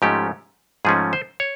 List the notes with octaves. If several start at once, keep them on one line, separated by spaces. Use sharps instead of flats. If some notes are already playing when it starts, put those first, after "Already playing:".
G#2 F3 A3 C#4 G4
G#2 F3 A3 C#4 G#4
C5
C#5